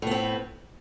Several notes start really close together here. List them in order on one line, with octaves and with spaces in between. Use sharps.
A2 B3 C4